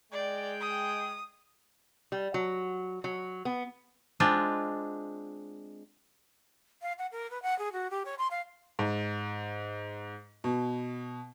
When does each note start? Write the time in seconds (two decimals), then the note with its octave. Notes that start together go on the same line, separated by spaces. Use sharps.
0.12 G#3 D5 G5
0.61 D#6
2.12 G3
2.34 F#3
3.04 F#3
3.45 B3
4.20 G#3 C4 D4 F4
6.82 F5
6.99 F#5
7.12 A#4
7.31 B4
7.43 F#5
7.59 G#4
7.73 F#4
7.90 G4
8.05 C#5
8.19 C6
8.31 F5
8.79 G#2
10.44 B2